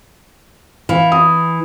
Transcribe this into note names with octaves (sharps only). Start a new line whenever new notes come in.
E3 F5
D#6